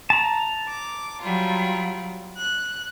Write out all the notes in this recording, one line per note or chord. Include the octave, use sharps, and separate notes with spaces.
A5 A#5
D6
F#3 G3 F4
F#6